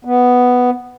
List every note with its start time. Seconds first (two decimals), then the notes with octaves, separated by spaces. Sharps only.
0.05 B3